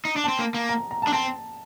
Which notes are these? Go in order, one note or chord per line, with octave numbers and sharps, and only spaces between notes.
D#4
D4
C4 A5
A#3
A#3
A#5
A#5
A5
D4
C4 A5